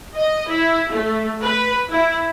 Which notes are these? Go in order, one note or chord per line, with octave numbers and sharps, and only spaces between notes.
D#5
E4
A3
B4
E4